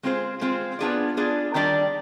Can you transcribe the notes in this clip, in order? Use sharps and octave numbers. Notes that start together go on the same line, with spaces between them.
G#3 C4 F4 G#4 C5
G#3 C4 F4 G#4 C5
B3 D4 F4 G#4 D5
B3 D4 F4 G#4 D5
D#3 G3 D4 G4 D5